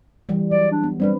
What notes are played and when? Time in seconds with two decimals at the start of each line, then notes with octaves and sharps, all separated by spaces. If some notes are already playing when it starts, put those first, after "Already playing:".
0.29 E3 G3
0.51 F#3 D5
0.71 D4
0.84 B3
1.00 G3 C4 D4 B4